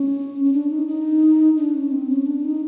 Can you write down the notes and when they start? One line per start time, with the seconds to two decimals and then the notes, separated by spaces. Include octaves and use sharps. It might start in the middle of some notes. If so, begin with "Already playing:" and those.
Already playing: C#4
0.45 C#4
0.53 D4
0.71 D#4
0.87 D#4
1.57 D4
1.75 C#4
1.92 C4
2.09 C#4
2.26 D4
2.45 D#4